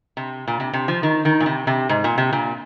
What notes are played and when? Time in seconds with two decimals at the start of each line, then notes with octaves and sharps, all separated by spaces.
0.17 C3
0.48 A#2
0.60 C3
0.73 C3
0.88 F3
1.03 D#3
1.25 D#3
1.40 A#2
1.46 C3
1.67 C3
1.89 G#2
2.04 A#2
2.18 C3
2.33 A#2